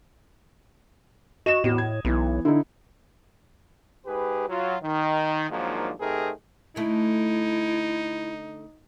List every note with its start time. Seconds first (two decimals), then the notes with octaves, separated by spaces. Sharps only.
1.46 F#4 D#5 E7
1.64 E2 A2 F#4
1.78 G#6
2.05 B1 E3 B3
2.45 D3 D#4 E4
4.06 G#2 G4 G#4 B4
4.49 F#3 F4
4.82 D#3
5.50 G#2 D#3 F3 F#3 A#3 D4
6.00 C3 A3 C4 D#4 G#4 A#4
6.76 D3 A3 D#4 E4